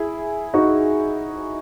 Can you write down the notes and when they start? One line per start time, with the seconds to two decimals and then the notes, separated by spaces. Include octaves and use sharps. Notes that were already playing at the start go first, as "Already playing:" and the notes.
Already playing: E4 G#4
0.54 D#4 F#4